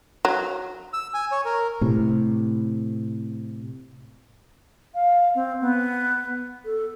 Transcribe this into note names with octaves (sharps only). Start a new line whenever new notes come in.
F#3
E6
G#5
C#5
A#4
A2 C3
F5
C4
B3
A4